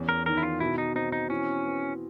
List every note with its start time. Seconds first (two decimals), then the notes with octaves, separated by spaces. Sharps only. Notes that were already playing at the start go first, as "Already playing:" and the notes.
Already playing: E2 C#4
0.09 A#4
0.26 D#3 A#4
0.37 E4
0.43 F4
0.60 B2 E4
0.78 D#4
0.95 C4 D#4
1.12 D#4
1.30 E3 C#4
1.66 B3